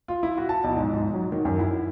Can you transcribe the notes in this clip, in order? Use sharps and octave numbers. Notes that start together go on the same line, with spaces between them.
F4
E4
F#4
A5
B1
G#2
G#2
F#3
D#3
F#2
E4